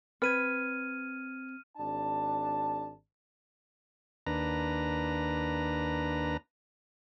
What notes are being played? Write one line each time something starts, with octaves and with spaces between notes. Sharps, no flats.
C4 B4 F6 G#6 D#7
G#1 D4 A5
D#2 D4 B4 A#5